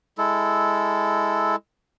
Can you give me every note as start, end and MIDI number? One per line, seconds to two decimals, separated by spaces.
0.18 1.56 56
0.18 1.56 64
0.18 1.56 69